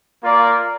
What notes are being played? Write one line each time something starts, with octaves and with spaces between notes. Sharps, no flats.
A#3 F4 A#4 D5